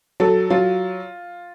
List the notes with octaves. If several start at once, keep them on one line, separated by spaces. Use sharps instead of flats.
F#3 A4
F#3 F4